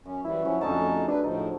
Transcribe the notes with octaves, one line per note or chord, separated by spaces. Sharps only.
F#2 C#4
E3 G3 E4
F3 F#3 C#4 F#4
F2 D3 A3 C#4 D#4 G#4 A5
D4 B4
A2 F3 D#4 A4